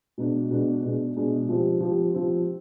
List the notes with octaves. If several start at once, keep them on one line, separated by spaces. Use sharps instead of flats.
B2 G#3 D4
B2 G#3 D4
B2 G#3 D4
B2 G#3 D4
F3 C4 G4
F3 C4 G4
F3 C4 G4